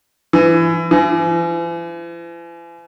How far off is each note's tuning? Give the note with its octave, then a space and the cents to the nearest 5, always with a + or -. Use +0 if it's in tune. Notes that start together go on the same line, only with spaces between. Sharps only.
E3 +25
E3 +45